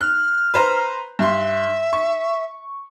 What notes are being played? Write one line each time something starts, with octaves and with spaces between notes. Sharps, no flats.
F6 F#6
B4 C5 A#5
G2 E5 C6
C#6